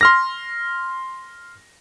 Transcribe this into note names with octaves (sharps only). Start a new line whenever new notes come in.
C6 F6 A#6